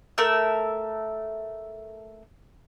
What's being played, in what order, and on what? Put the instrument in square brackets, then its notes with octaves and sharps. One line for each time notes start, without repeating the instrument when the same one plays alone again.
[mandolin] A3 A#4 E5 E6